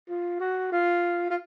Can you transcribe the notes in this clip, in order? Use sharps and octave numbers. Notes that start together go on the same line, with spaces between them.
F4
F#4
F4
F4